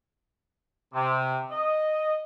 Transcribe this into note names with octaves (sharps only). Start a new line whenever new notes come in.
C3
D#5